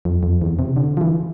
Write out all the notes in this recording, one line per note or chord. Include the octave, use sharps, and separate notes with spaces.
F2
F2
E2
C3
D3
F3
E3